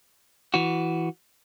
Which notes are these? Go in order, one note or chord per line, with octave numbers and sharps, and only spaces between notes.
E3 F#4